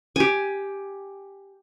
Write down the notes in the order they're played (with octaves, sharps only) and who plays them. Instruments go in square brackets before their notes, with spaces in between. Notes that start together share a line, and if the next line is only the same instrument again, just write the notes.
[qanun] G4 G#5